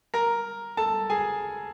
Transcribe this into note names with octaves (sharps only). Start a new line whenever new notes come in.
A#4 A#5
A4 A5
G#4 G#5